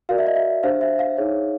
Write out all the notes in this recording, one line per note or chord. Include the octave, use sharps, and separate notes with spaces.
F#4 A#4 D5 F5
E5
D#5
E5
D4 G4 C5 F5
E5
F5
D#4 G#4 C#5